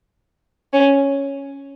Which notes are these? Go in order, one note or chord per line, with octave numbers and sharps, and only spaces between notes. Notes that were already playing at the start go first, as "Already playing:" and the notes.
C#4